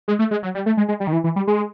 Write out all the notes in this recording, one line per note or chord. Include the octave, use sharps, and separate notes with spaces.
G#3
A3
G#3
F#3
G3
A3
G#3
G#3
G3
D#3
E3
E3
G3
G#3